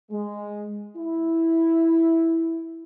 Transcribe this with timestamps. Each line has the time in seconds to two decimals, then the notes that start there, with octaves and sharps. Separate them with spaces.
0.11 G#3
0.97 E4